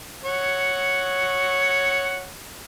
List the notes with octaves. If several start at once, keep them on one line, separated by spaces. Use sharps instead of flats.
C#5 F#5